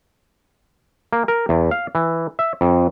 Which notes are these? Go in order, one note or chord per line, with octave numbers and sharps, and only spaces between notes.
A#3
A#4
E2
F5
E3
E5
F2